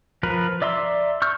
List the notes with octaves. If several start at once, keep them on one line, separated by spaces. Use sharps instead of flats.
F3 A#4 B4
D5 E5 A#5 C6
C#6 E6 F6 G6